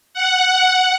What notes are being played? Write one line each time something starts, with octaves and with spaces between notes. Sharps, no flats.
F#5